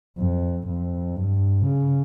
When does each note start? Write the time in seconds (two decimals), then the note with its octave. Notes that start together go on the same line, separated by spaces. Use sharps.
0.18 F2
0.67 F2
1.16 G2
1.64 C#3